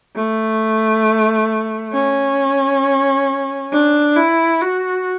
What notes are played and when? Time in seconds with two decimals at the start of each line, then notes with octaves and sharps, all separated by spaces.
0.16 A3
1.93 C#4
3.72 D4
4.16 E4
4.61 F#4